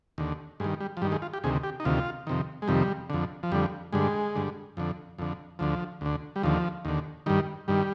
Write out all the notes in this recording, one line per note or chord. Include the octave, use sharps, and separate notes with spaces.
D#2 D3
G2 D#3 G#3
G3
F3
G2 D#3 G3
G#3
F4
G4
D2 C3 D#3 G#4
G4
D#4
D2 C3 D#3 F4
F2 C3 D#3
G#3
F2 C3 D#3 G3
F2 D3
F3
F2 D3 G3
G2 D3 G#3
G2 D3
F2 D3
F2 D3
D2 D3 F3
D2 D3
G3
D#2 D3 F3
D#2 D3
G2 D#3 G3
G2 D#3 G3